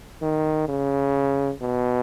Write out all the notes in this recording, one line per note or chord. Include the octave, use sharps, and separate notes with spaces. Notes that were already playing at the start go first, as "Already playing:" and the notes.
D#3
C#3
B2